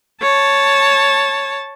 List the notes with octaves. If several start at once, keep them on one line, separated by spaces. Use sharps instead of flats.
C#5 A5